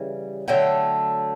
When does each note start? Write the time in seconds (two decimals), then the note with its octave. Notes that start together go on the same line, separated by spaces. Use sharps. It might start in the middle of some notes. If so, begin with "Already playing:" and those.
Already playing: C#3 E3 G3
0.48 D3 F#3 A3 G5